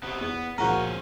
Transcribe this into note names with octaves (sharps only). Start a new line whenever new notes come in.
C3 B3 C#6 D#6
E2 B3
C#2 A#2 F3 C#4 F#4 A#4 C5